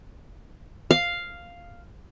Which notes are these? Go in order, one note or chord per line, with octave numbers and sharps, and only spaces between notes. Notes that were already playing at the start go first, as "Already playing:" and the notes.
F5